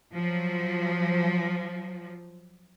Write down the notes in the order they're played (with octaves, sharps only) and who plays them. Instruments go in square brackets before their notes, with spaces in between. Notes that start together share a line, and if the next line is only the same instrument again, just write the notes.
[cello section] F3 F#3